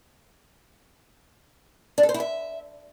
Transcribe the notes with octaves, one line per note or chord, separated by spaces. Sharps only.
D4
A4
C5
E4
E5